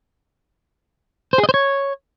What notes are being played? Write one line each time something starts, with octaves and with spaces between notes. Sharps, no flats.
C5
G#4
D#5
C5
C#5